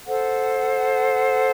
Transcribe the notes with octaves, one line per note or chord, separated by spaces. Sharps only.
A4 C5 F#5